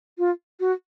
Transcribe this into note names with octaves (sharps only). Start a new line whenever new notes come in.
F4
F#4